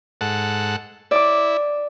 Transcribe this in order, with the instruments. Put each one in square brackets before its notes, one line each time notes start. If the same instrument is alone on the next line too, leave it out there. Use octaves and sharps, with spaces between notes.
[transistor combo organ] G#2 A4 F#5
[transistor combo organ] E4 [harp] D5 D6